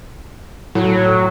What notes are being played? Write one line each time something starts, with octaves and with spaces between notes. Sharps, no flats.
A2 F#3